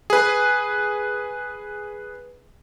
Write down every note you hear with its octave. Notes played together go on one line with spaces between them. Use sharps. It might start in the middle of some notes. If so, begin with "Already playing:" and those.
G#4 B4